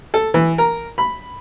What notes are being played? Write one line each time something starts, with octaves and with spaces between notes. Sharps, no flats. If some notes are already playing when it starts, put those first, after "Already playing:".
A4
E3
A#4
B5